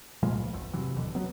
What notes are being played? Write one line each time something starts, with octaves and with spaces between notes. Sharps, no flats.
A#2 F3 G#3 A#3
C#2
G#1 E2
C3 E3 F#3
F#1 D#2 B2 D3
F#3 B3